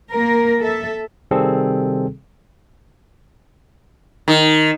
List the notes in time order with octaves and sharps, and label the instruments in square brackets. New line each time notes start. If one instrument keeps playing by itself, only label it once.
[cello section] A#3 A#4
A4 E5
[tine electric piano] C3 D#3 G3 C4 G#4 A4
[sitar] D#3